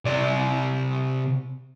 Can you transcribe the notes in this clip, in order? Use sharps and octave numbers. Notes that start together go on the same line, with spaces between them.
C3 D5